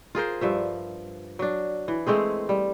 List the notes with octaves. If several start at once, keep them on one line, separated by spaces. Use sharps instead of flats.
F4 G#4 A#4 C5
G2 F3 E5
F#3 D4
E3
G#3 A3 C4 G#4
G3